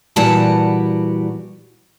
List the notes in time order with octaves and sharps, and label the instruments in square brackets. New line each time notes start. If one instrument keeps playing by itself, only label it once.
[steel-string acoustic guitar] A#2 E3 G3 F#4 B4 A5